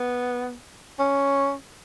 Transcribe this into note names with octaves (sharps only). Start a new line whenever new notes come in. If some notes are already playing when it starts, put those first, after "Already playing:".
Already playing: B3
C#4